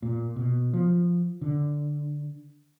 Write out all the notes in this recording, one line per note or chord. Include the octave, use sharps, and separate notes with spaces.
A#2
B2
F3
D3